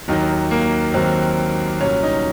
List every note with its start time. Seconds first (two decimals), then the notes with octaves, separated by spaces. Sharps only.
0.08 D#2 D#3 F#3 D#4
0.51 A#3
0.94 D#2 D#3 F#3 C4
1.80 C2 A#2 F#3 C#4
2.03 D#4